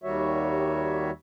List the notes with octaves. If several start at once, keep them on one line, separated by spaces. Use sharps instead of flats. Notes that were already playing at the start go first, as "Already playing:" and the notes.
D#2 D#3 G3 F#4 C#5 E5